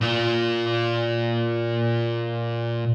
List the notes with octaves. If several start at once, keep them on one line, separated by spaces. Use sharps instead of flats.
A#2 F4